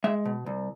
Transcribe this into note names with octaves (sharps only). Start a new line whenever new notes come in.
G#3 E5
B2
C2